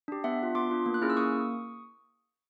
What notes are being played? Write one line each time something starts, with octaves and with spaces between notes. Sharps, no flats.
D4 G4
B3 E5 F#5
D4 F4
B3 C6 D6
D4 F4
A#3
F#6
C#4 E4 G#4 F6
E6
A#3 C#6 D#6